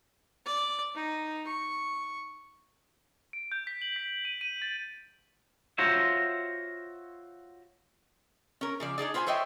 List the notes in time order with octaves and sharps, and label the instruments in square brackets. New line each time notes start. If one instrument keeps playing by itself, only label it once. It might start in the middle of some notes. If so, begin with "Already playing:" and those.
[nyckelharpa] D5
D#4
C#6
[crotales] D7
G6
B6
F#7
B6
D#7
D#7
A6
[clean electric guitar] F4 F#4 C5 C#5 E5
[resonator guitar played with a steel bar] C#4 A#4
C#3 F3 D5
D4 D#4 G#4 D5
F4 B4 C5 F#5 G#5
A4 C5 C#5 D#5 E5 G5